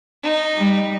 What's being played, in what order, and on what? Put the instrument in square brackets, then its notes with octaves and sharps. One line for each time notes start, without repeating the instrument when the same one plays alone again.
[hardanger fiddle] D#4
[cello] G3